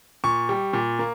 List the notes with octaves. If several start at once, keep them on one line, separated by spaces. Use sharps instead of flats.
A#2 C#6
G3
A#2
A#3